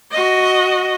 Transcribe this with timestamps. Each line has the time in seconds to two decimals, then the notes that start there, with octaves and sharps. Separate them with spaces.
0.11 F#4 D#5